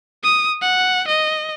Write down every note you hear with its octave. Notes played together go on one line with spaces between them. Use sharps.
D#6
F#5
D#5